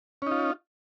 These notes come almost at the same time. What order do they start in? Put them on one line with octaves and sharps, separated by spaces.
C#4 D#4 F4